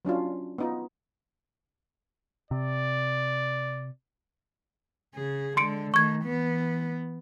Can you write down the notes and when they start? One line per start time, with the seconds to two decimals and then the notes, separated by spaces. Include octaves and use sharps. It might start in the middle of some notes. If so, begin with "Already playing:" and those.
0.05 F#3 C#4 D4 F4
0.58 B3 D#4 F4
2.51 C3 D5
5.15 C#3 G#4
5.57 D3 G#3 C6 C#7 D7
5.94 D#3 A3 C#6 G#6
6.24 E3 B3